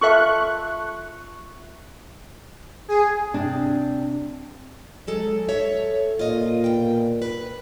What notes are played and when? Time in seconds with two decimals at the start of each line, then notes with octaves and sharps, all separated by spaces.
0.01 F4 A4 E5 C#6 F#6
2.88 G#4
3.34 C3 D4
5.07 F#3 G#3 A4
5.48 A4 C#5 E5
6.19 A#2 F4 D#5
6.64 B2 G5
7.22 B4